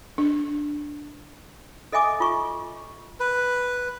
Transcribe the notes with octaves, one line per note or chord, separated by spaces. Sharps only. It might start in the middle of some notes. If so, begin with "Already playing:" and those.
D4
A4 D#5 E5 G#5 D6 D#6
F4 C#6
B4